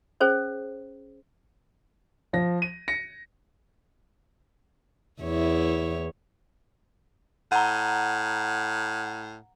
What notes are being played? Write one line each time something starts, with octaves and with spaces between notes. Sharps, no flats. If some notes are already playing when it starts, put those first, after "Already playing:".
C#4 G#4 C5 C#5
F3 A#6
D#7
A#6 C#7
E2 E4 C#5
A2 F#5 A#5